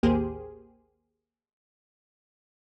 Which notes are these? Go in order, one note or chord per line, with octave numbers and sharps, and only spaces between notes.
A1 D#2 A#3 G4 G#4 C5